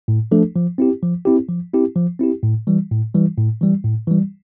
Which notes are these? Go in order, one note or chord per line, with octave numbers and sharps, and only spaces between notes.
A2
F3 A3 D4 A4
F3
C4 E4 G4
F3
C4 E4 G4
F3
C4 E4 G4
F3
C4 E4 G4
A2
E3 G3
A2
E3 G3
A2
E3 G3
A2
E3 G3